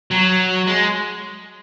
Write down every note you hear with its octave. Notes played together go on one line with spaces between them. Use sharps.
F#3
G#3